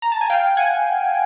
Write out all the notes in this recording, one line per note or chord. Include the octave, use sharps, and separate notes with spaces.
A#5
A5
G#5
F5 G5
F#5 G#5